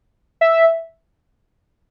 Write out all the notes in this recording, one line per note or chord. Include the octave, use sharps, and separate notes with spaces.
E5